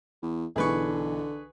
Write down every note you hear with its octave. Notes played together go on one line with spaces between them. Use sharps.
E2
B1 D3 E3 G#4 B4 C#6